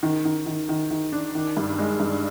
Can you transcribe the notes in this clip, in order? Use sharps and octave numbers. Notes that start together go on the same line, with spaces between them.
D#3
D#3
D#3
D#3
D#3
D4
D#3
G2
G#3
G2